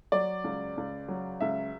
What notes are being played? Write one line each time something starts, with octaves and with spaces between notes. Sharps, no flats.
F#3 D5
C#2
C#2
F#3
C#2 E5